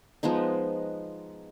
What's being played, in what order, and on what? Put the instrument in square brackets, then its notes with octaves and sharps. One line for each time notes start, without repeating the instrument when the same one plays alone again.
[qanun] F3 G#3 B3 D#4